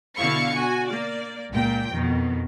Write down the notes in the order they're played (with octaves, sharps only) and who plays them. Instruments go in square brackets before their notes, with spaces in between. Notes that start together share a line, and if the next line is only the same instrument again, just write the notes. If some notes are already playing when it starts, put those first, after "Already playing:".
[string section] B2 D3 E4 F5 C#6 C#7
F#4 G#5
A#3 D5
C#2 A#2 G5
F2 B2 D#3